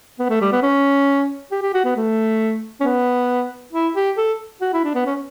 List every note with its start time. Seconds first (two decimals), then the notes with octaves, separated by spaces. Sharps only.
0.19 B3
0.29 A3
0.41 G3
0.52 B3
0.63 C#4
1.52 G4
1.63 G4
1.74 F#4
1.85 B3
1.96 A3
2.81 C#4
2.84 B3
3.73 E4
3.96 G4
4.17 A4
4.61 F#4
4.73 E4
4.84 D4
4.95 B3
5.06 C#4